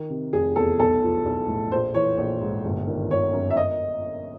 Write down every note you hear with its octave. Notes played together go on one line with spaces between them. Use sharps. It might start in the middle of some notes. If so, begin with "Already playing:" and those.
Already playing: D#3
C3
F1 G#4
E2 A4
B1 A4
F3
B1
A2
A#1 C5
E3 C#5
A#1 C#5
G#2
G1
D#3
G1 C#5
F#2
E5
D#5